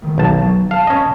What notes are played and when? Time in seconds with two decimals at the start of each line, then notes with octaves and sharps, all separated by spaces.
0.02 A2 D#3
0.18 B1 A5
0.42 F#3
0.71 F5 A5
0.87 C#4 D#5